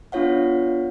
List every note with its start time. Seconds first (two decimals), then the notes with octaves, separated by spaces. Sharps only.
0.12 B3 D4 F4 C#5 F5 F#5